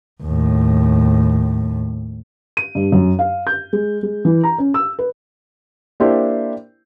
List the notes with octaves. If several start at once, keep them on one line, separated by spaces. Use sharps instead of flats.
D#2 A2
D#7
G2
F#2
F5
G6
G#3
G#3
E3
A#5
C#4
E6
B4
A#3 D4 E4 G4 C5